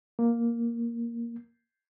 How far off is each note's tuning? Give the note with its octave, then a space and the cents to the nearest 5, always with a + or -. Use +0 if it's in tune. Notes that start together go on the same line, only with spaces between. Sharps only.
A#3 +5